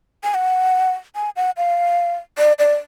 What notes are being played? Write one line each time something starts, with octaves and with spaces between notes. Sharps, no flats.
G#5
F#5
G#5
F#5
F5
D5
D5